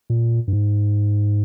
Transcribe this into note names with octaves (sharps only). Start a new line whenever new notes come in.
A#2
G2
G#2